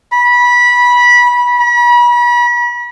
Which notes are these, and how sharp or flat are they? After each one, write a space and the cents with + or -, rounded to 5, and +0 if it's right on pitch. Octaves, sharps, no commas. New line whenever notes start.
B5 -20
B5 -40